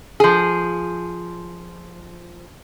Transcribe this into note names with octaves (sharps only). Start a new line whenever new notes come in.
F3 G#4